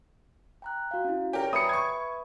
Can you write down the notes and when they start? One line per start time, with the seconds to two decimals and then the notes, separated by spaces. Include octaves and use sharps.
0.62 G5 A#5 F#6
0.91 F#4 F5
1.04 C#4 E4
1.33 G4 A#4 C#5 D5 G5
1.53 F#2 B4 E5 B5 D#6 C#7
1.69 C#6 G#6